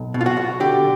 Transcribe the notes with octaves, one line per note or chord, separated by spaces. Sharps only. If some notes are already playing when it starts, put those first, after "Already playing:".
Already playing: B1
B2
F4
F#4
B1
D3 G4